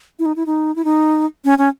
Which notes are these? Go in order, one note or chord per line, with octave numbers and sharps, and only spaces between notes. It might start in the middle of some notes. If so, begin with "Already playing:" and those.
E4
D#4
E4
D#4
E4
D#4
C#4
C#4